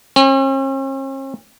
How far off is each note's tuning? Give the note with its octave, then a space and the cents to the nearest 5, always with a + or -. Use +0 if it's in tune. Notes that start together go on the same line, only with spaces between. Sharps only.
C#4 -45